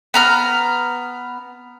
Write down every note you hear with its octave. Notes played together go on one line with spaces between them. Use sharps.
B3 A#5 F6